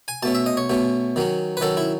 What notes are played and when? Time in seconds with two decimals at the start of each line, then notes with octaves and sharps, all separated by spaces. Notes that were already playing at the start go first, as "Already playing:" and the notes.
0.08 G#5
0.23 B2 A3 C#4 A5
0.35 E5
0.46 D#5
0.57 C#5
0.70 B2 A3 C#4
1.16 D#3 F#3 C#4
1.57 B4
1.61 D#3 F#3 C#4 A4
1.77 E4